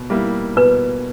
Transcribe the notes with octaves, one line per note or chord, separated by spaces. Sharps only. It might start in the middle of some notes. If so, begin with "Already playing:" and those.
Already playing: B2
G3 A#3 E4
B2 B4